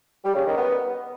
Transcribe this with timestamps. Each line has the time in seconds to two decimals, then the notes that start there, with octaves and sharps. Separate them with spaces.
0.24 G3
0.35 C#3
0.46 D#3
0.57 B3